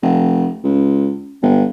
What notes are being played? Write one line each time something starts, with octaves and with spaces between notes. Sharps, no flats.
F1
C#2
G1